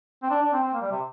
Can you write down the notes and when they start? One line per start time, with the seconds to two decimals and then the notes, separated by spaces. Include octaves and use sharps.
0.23 C4
0.30 D4
0.42 D4
0.53 C4
0.64 C4
0.74 A#3
0.81 G3
0.91 C3